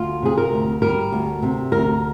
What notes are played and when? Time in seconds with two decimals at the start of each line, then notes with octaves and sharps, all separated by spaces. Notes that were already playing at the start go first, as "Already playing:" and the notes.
Already playing: D2 F4
0.22 C3 G#4
0.38 A#4
0.52 D2
0.82 G3 A#4
1.12 D2
1.42 C3
1.72 D2 A#4